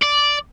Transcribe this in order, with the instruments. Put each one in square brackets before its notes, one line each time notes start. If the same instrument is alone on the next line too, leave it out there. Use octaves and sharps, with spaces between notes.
[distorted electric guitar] D5